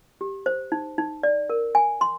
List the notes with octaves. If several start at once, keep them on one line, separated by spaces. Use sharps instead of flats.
G4
C5
D#4
D#4
D5
A#4
G#5
C6